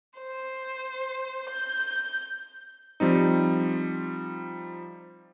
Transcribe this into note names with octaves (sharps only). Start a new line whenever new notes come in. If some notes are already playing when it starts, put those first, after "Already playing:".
C5
G6
F3 G3 C4 D#4